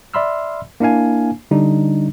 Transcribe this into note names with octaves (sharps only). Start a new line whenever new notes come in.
D5 E5 B5 C6 E6 F6
A#3 D4 E4 F5 G#5
D3 G3 D4 D#4